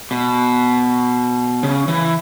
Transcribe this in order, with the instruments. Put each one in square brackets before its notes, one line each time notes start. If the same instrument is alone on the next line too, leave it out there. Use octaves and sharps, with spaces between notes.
[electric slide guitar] B2
C#3
E3